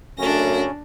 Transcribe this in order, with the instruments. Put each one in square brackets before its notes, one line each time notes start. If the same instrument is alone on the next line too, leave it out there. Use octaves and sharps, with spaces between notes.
[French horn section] F#2 A3 [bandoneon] C#3 C#4 [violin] D4 A#6